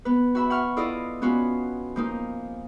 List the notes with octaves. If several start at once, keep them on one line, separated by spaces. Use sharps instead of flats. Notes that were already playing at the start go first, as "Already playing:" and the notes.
B3 B4
F#4 E5 B5
F#5 C#6 F6
E4 F4 A4 D5 D#5
B3 C#4 F4 F#4 B4
F3 A#3 D#4